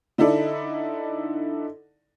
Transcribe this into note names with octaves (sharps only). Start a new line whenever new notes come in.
D3 D#4 E4 A4 D5